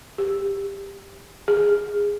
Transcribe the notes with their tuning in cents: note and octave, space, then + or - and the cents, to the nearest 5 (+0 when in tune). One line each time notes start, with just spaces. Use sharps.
G4 +15
G#4 -15